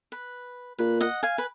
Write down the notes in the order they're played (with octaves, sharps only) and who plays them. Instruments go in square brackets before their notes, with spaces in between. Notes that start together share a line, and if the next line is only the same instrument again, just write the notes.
[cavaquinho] B4
[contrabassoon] A#2 [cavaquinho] B4
[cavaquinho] D#5 F#5
F5 G#5
B4